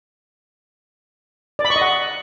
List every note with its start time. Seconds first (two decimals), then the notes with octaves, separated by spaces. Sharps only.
1.59 D5
1.65 B5
1.70 C#6
1.76 D#5
1.81 F#5